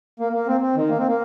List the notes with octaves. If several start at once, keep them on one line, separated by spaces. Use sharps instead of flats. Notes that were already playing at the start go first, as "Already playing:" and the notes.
A#3
A#3
C4
C4
D#3
A#3
C4
A#3